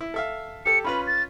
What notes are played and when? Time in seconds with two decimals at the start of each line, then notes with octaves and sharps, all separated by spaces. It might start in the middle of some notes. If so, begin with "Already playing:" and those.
0.01 E4
0.14 A4 E5 F5
0.66 G4 A4 C#7
0.85 C#4 F4 B4 B5
1.07 A6